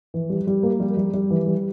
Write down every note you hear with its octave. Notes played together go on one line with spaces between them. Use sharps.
E3
G3
G3
A#3
G3
G3
G3
E3
G3